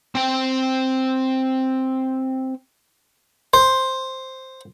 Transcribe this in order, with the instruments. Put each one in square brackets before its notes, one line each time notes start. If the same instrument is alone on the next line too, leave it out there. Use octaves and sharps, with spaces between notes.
[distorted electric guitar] C4 G5
[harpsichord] C5